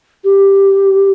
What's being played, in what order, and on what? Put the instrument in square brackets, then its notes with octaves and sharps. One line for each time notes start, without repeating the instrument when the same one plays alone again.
[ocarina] G4